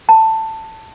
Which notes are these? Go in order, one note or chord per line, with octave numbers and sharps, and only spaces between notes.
A5